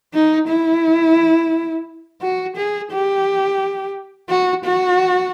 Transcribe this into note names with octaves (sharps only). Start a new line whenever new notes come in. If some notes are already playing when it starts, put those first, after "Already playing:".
D#4
E4
F#4
G#4
G4
F#4
F#4